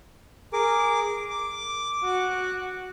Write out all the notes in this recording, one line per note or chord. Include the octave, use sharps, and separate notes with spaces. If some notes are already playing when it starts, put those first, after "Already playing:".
G#4 A#4 D6
D6
F#4